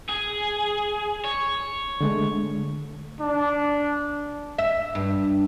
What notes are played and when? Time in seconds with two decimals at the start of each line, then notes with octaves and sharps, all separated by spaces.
0.09 G#4
1.24 C#5
2.01 D3 G#3 A3
3.20 D4
4.58 E5
4.95 G2